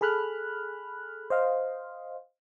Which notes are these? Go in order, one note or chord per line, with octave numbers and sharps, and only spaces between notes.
G#4 A4 B5 F6 F#6
C5 D#5 F5